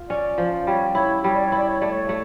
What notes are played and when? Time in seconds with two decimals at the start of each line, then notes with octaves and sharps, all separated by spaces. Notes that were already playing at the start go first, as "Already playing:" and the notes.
Already playing: F4
0.09 C#4 D5
0.38 F3
0.67 G3 C#5
0.95 E4 C#5
1.24 G3 C#5
1.35 D5
1.46 C#5
1.52 E4
1.58 D5
1.69 C#5
1.80 A3 D5
1.91 C#5
2.09 A3